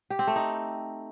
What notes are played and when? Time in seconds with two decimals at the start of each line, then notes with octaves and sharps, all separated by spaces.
0.10 G4
0.19 C4
0.27 A3
0.36 D#4